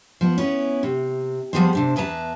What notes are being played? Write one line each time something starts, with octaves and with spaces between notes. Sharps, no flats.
F3 B3
B3 C#4 E4
C3
F3 G3 B3 C4 G#4 C5
C3 D4 C5
E2 B4 E5 A5 A#5